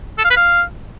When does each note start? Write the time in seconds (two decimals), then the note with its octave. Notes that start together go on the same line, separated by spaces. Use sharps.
0.18 A4
0.24 F5
0.30 B4
0.36 F5